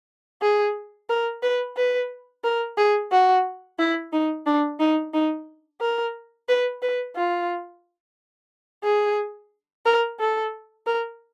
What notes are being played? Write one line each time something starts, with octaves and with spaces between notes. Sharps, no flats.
G#4
A#4
B4
B4
A#4
G#4
F#4
E4
D#4
D4
D#4
D#4
A#4
B4
B4
F4
G#4
A#4
A4
A#4